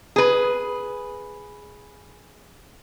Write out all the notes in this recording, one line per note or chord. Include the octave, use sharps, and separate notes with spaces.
G#4 B4